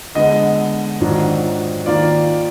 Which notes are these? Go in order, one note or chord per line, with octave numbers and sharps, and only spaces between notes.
D3 G#3 B3 D#5
G#2 D#3 F#3 D4 F4
D#3 A#3 F4 D5